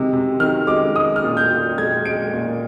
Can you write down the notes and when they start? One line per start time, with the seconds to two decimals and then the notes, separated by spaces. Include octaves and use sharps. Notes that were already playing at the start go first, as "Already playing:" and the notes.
Already playing: C3 D#3 G#3
0.13 C3
0.40 D#3 F6
0.67 G#3 D6
0.95 G#3 D#6
1.16 F6
1.23 A#2
1.37 G6
1.50 A#2
1.78 G#3 G#6
2.05 G#3 D7
2.33 A#2